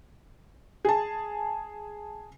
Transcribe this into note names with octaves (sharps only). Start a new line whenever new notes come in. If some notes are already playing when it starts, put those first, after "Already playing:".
G#4 A5